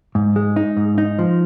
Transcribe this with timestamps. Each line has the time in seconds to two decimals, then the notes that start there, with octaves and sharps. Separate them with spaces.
0.15 G#2
0.36 G#3
0.56 D#4
0.77 G#2
0.98 D#4
1.19 F3